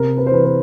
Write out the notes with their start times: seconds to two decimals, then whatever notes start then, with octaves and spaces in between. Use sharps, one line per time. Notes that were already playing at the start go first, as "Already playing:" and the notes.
Already playing: C3 A#4
0.17 B4
0.26 C5
0.31 E3 B4
0.45 B4